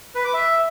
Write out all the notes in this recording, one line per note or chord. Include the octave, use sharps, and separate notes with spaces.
B4
D6
E5